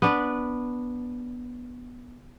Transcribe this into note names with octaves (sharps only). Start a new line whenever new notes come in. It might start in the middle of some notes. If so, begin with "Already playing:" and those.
B3 D4 B4